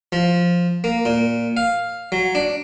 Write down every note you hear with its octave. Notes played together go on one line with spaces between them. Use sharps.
F3
A#3
A#2
F5
F#3
D4